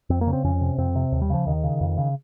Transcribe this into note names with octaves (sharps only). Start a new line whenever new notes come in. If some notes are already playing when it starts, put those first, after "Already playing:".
F2 C4
A#3
C#3
C4
F2 C#4
C3
F2 C4
C3
D#2
G3
C#3 F3
D#2 D#3
C#3
F2
C#3